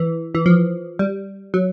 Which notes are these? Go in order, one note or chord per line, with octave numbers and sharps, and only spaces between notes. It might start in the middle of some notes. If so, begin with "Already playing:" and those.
Already playing: E3
E3
F3
G3
F#3